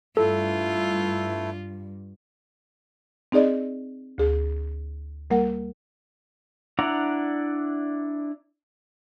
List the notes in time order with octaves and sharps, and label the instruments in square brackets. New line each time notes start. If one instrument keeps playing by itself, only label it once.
[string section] G2 [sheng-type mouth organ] A3 E4 [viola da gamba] F4 [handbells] A4
[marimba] C4 D#4 G#4 D5 D#5
D2 G#4
G3 A#3 A#4 F#5
[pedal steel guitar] D4 E4 D5 F#5 A#5